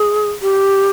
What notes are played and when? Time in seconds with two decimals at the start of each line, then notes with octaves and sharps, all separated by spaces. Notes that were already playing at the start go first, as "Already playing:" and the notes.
Already playing: G#4
0.42 G4